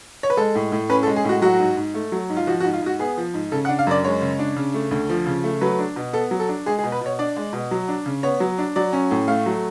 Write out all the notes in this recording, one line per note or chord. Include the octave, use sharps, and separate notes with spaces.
C#5
B4
G#3 A4
A2
A2
C#4 B4
A4
G#3
G#4
A2 F#4
F#3 F#4
G#2
G#2
A3
F#3
G#2
F4
F3 F#4
F#4
G#2
F4
G#2 F#4
B3 G#4
F3
G#2
C#3 A4
F#5
D4
F5
F#2 D5
G#3 C#5
C#3
D4
C#3
A3
D2
F3
C#3
A3
F#3 B4
D4
B2
B3 A4
F#3
A4
D4
G#3 G#4
G#4
B2
B4
B2 C#5
D4 D5
G#3
B2
F#3
D4
C#3
B3 C#5
F#3
D4
F#3 D5
C#4
A2
A3 F5
F#3